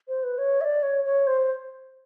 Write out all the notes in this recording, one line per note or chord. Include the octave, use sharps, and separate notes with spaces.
C5
B4
C#5
E5
D5
C#5
C#5
C5